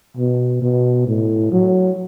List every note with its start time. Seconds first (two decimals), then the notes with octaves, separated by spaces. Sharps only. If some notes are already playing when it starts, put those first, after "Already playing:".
0.17 B2
0.62 B2
1.07 A2
1.52 F#3